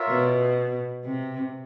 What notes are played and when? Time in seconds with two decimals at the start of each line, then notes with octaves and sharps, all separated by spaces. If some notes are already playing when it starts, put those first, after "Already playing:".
Already playing: F4 A#4 C#5 E5
0.09 B2
1.04 C3